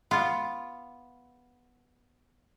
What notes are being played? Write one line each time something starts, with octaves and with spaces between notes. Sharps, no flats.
B3 F4